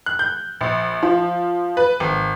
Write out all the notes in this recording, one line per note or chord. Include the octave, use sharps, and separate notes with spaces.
F#6
G6
A#1
F3
B4
G#1